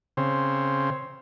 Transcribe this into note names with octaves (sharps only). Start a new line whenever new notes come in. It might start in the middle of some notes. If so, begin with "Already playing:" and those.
C#3 C4